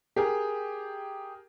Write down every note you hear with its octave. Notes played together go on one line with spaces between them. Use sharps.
G4 G#4 A#4